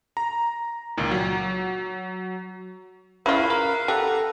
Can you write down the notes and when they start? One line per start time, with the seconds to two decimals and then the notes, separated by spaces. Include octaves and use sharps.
0.17 A#5
0.97 C#2 A#2 D#3
1.11 F#3
3.26 C#3 E4 F4 B4 F5
3.50 A#4
3.88 G4 A4 F#5 A#5